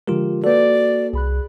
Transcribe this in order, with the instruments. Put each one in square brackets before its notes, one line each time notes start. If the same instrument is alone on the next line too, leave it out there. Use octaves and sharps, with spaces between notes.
[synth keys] D3 F3 G#3 [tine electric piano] F4 G4 A#4
[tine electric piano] A#3 A4 [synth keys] F#4 B4 [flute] D5
[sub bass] C2 [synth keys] G#4 B5 F#6